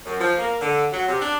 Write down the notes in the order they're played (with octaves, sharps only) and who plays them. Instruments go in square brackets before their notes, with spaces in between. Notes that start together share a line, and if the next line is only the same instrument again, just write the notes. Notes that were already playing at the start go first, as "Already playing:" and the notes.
[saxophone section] F#2
F3
A#3
D3
F#3
C3
D4